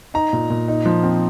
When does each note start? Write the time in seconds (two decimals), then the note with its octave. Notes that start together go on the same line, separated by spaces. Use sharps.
0.14 D#4 A#5
0.33 A#2
0.50 A#2
0.68 D#4
0.85 F3
1.03 C4